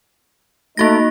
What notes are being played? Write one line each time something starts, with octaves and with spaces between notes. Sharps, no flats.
A3 A#3 D#4 F#4 A#6